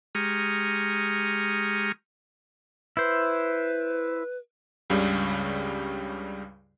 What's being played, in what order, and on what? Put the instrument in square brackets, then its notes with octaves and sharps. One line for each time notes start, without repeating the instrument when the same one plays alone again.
[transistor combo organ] G#3 G4 A#5 C#6 D#6 F6
[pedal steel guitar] E4 C5 [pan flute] B4
[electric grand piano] C#2 G2 C#3 G3